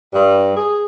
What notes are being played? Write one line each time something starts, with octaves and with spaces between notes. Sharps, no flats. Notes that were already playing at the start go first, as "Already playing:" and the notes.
G2
G#4